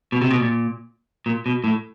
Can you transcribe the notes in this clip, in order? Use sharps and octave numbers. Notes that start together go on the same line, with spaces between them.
B2
C3
B2
A#2
A#2
B2
A2